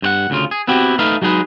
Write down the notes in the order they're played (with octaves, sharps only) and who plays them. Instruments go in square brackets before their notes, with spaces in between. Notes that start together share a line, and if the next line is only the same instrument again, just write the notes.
[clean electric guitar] G2 C5 F#5
D2 C#3 F4
G#4
B3 C4 E4 F#4 G4
A3 D#4 B4 F5
F#3 G#3 D#4 G#4 B4